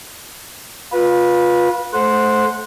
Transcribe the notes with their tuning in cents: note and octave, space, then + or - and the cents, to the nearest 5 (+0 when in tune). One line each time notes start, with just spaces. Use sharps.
F4 +20 B4 -20
A3 -25 C5 +0 F#5 -20